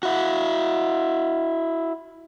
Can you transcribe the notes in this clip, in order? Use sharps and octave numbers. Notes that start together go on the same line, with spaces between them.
E4 F#4